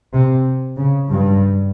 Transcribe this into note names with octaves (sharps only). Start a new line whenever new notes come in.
C3
C#3
G2